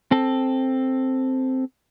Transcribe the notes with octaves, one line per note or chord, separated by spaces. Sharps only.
C4 A4